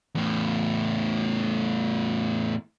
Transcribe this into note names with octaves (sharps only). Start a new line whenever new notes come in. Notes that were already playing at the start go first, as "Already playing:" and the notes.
E2 A2